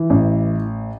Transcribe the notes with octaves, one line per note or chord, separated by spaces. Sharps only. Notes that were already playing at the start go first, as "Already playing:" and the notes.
Already playing: E3
A1